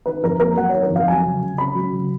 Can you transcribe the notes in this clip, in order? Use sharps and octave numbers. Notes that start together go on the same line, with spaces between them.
D#3 B4
F2 A#4
A#3 A#4
F#3 F#5
D#3 C#5
A#4
F2
F5
F#3 G#5
C#3
C#3
C#4 B5
F#3
C#3